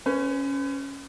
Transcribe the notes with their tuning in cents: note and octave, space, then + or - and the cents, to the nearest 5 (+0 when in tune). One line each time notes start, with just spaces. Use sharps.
C#4 +0 B4 +45